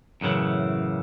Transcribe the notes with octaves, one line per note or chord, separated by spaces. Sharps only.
F#2 A2 C#3 E3